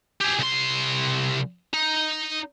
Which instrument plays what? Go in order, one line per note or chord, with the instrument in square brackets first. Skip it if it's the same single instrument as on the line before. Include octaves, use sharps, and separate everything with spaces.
[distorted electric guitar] G4 G#4
C2 C6
D#4